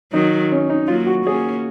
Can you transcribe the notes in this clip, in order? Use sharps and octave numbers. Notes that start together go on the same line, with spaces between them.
D#3 F#3 D#4
C#4
D#4
F#3 A#3 F4
F#4
A#3 C#4 G#4